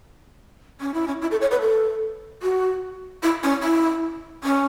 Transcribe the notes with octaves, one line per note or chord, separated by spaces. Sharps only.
C#4
E4
C#4
E4
A4
C#5
B4
A4
F#4
E4
C#4
E4
C#4